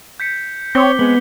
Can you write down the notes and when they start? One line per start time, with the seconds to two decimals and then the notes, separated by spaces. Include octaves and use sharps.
0.20 G6 B6 C#7
0.75 C4 C#5 D6 C#7 G7
0.99 G#3 B3